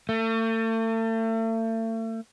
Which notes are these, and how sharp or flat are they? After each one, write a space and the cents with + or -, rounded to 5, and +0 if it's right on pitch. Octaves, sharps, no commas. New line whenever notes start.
A3 +40